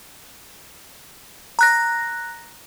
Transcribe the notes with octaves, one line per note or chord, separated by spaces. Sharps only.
A#5 F#6 A#6